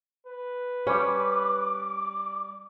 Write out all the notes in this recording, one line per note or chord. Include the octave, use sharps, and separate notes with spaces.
B4
G3 C#4 D6